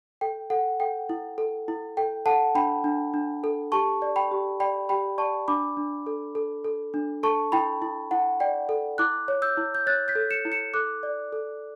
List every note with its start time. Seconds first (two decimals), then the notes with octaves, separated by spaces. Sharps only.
0.21 A4 G5
0.50 A4 F#5
0.80 A4 G5
1.09 E4
1.38 A4
1.68 E4
1.97 A4 G5
2.26 A4 F#5 A5
2.55 D4 G5 B5
2.84 D4
3.14 D4
3.44 A4
3.72 G4 A5 C#6
4.02 D5
4.16 G5 B5
4.31 G4
4.60 D5 G5 B5
4.89 G4 G5 B5
5.18 D5 A5 C#6
5.48 D4 B5 D6
5.77 D4
6.06 A4
6.35 A4
6.65 A4
6.94 D4
7.23 A4 A5 C#6
7.52 E4 G5 B5
7.82 E4
8.11 E4 F#5
8.40 D5 G5
8.69 A4
8.98 E4 D6 F#6
9.28 C#5
9.42 E6 G6
9.57 E4
9.75 G6
9.86 C#5 F#6 A6
10.08 G6 B6
10.15 A4
10.31 C#7 E7
10.45 E4
10.52 C#7 E7
10.74 A4 D6 F#6
11.03 D5
11.33 A4